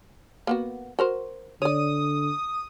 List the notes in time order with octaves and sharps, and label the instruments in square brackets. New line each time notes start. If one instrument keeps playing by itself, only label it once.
[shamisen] A#3 B3 F#4
F#4 A#4 C5
[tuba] D3 [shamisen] C#5 D5 [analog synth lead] D#6